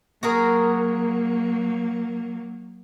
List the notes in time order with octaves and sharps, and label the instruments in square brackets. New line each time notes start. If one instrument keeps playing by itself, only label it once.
[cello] F#3 A#3 [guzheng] F#4 G#4 A#4